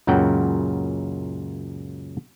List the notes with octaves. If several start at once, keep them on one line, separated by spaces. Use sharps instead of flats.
C#2 F#2 A#2 C#3 F#5 G5